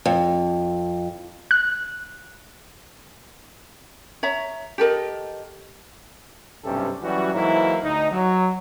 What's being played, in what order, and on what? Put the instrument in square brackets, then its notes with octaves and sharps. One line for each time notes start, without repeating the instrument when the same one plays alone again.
[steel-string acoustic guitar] F2
[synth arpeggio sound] F#6
[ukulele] C#5 E5 A#5
G4 A4 A#4 D#5
[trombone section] B1 G2 C3 C#4 G4 A4
E3 F#3 G3 C#4 F#4
G#2 E3 F#3 A#3 E4
D2 D#4
F#3